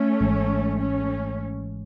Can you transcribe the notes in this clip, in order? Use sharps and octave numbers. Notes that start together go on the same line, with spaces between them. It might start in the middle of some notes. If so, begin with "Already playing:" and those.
Already playing: A3 C#4
G#1 G#2 E3 G#3
A3 C#4